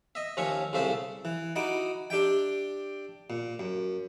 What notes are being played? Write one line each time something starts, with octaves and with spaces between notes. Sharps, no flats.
D#5 E5
D#2 F3 C#4 C#5 E5 C#6
C2 C#3 A3 C5 E5 A5
E3
D#4 E4 F#4 D6
D4 G4 E5 G5
A#2
F#2